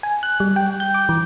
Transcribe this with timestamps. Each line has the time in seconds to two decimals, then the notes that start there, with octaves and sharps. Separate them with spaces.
0.03 G#5
0.23 F#6
0.40 G3
0.56 G5
0.80 G6
0.94 D6
1.09 E3